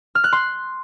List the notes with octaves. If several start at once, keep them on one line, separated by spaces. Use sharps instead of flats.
F6
F#6
C6